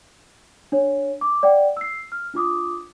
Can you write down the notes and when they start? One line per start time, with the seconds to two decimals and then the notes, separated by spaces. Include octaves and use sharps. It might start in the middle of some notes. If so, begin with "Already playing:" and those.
0.72 D4 C#5
1.21 D6
1.43 D5 F#5 G5
1.77 E6 C7
2.12 F6
2.34 D4 F4 D6 D#6